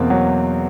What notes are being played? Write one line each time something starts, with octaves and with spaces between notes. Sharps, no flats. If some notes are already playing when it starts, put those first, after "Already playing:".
Already playing: E2 B2 A#3 C4
F#3